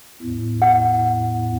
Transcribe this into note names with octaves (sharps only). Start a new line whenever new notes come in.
E2 A2
F#5